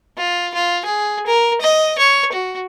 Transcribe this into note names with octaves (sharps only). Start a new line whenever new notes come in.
F4
F4
G#4
A#4
D#5
C#5
F#4